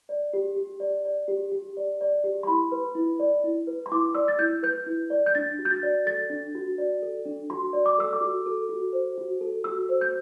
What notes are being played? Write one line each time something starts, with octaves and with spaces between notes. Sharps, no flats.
D5
G4
G4
D5
D5
G4
G4
D5
D5
G4
C6
E4 B5
B4
E4
D5
E4
B4
C6
E4 D6
D5 E6
A6
E4 G6
B4 G6
E4
D5
G6
D4 A6
F#4
G6
A6
D5
A4 A6
D4
F#4
D5
A4
D4
F#4 C6
D5
D6
A4 E6
D6
F#4
A4
F#4
C5
F#4
A4
F#4 E6
C5
G6